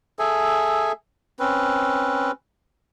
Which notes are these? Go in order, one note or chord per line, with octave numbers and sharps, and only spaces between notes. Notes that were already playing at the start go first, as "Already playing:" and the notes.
G#4 A4 E5 G#5
C4 C#4 B4